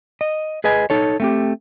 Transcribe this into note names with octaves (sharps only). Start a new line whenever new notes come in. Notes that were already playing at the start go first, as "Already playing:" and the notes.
D#5
G#4 B4 D#5 G#5
D#4 A4 C#5
A3 C4 G4